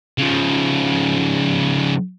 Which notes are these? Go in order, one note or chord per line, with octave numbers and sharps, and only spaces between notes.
C#3 F3